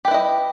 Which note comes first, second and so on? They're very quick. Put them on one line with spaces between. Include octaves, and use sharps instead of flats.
G4 B4 E4 D#5